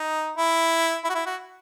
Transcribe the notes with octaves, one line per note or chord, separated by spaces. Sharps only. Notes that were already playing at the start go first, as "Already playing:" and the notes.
Already playing: D#4
E4
E4
F#4
E4
F#4